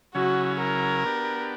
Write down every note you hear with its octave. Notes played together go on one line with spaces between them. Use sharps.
C#3 F#3 C#4 E4 F#4
A#4
B3 D4 G4